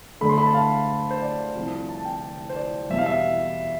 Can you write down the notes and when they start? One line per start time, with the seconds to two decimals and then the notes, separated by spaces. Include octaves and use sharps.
0.21 D2 D3 A3 B5
0.29 C6
0.38 B5
0.46 A5
0.54 F5
1.10 C5
1.22 D5
1.55 C2 C3 F3
1.89 A5
2.05 G5
2.50 C5
2.56 D5
2.89 E2 B2 G3 E5
2.98 F5
3.06 E5